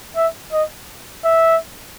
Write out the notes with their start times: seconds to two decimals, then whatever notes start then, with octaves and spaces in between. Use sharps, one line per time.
0.16 E5
0.52 D#5
1.24 E5